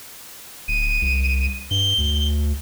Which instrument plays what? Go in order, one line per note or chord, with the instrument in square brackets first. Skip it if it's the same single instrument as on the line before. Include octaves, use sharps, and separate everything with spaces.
[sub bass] D1 [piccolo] D#7
[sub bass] C2
[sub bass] G2 [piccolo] G7
[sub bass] D2